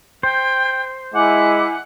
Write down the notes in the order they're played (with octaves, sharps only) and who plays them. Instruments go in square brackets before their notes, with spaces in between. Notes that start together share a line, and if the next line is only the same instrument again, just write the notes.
[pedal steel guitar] C5 [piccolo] G5
[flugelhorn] G#3 [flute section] E4 G#5 D6 [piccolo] F#5